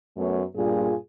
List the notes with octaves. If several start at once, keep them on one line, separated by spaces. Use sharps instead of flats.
F#2 A3 B3 C#5
G2 A#2 F4 G#4